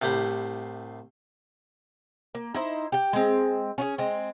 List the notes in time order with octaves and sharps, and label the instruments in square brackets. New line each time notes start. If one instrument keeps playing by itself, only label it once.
[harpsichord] C2 A2 G4 C5 B5
[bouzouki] A#3
D#4 E4 C5
G4 G5
G#3 C4
C#4 F#4 G#4
G#3 C4